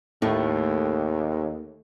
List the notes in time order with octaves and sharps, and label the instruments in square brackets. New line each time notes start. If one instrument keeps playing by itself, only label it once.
[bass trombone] D#2 [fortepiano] A2 [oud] A3